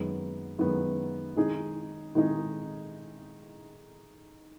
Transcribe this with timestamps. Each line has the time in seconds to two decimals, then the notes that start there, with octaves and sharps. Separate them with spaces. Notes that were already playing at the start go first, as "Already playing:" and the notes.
Already playing: F#2 D#3 G#3 B3
0.59 F#2 D#3 G#3 B3
1.36 D#3 G#3 D#4 G#4
2.15 D#3 G#3 D#4 G#4